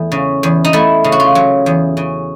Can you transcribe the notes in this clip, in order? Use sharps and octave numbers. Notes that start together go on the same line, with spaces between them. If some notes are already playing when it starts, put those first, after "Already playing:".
Already playing: E2 A3
C#3
E2
D#4
A3 E4
C#3
F#4
F4
F#3
E2
C#3